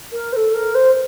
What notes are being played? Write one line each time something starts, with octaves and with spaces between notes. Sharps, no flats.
A#4
C5
A4
A#4
C5